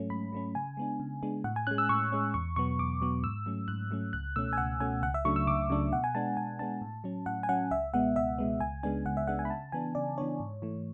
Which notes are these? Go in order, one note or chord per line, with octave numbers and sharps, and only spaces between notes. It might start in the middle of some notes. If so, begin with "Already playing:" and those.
Already playing: G#2 F#3 A3 C#4
G#2 B5
F#3 A3 C#4
C#3 G#5
G#3 B3 D4
C#3
G#3 B3 D4
A2 F#5
G#5
G#3 C#4 F#6
E6
A2 C#6
G#3 C#4
E2 C#6
B2 F#3 B3 C#6
E2 D6
B2 F#3 B3
G#2 E6
F#3 A3 C#4
G#2 F#6
F#3 A3 C#4
C#2 F#6
B2 A3 C#4 E6
G#5
C#2 F#5
B2 A3 C#4 G#5
C#2 F#5
E5
C#3 F#3 A3 D4 C#6
E6
C#2 D6
C#3 F#3 A3 D4
B2 F#5
G#5
G#3 B3 D4 A5
B2 G#5
G#3 B3 D4 A5
A2
F#3 C#4
A2 F#5
G#5
F#3 C#4 F#5
C#2 E5
B2 G#3 B3 F#5
C#2 E5
B2 G#3 B3
C#2 G#5
C#3 G#3 B3 D4 G#5
C#2 F#5
E5
C#3 G#3 B3 D4 F#5
G#5
B5
C#3 A5
E3 B3 D4 G#5
C#3 D5
E3 B3 D4 C#5
G#2
E3 A3